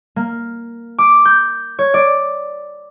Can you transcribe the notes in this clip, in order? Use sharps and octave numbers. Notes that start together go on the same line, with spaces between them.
A#3
D6
G6
C#5
D5